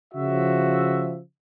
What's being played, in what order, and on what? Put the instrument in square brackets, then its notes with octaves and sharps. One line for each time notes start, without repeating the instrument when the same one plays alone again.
[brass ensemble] C#3 F3 F#4 E5